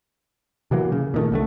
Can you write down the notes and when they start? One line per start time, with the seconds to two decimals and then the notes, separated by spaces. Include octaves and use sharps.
0.71 C3 E3 F#3 A#3
0.92 C#3
1.14 A#2 D#3 A3
1.32 C2 D3 A3